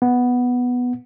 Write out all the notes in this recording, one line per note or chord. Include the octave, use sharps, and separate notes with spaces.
B3